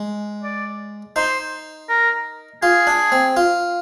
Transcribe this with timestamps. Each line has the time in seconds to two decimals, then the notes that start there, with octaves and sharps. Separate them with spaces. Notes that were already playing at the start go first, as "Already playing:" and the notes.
Already playing: G#3
0.43 D5
1.16 D#4 C5
1.89 A#4
2.62 F4 G#4
2.87 D4
3.12 C4
3.37 F4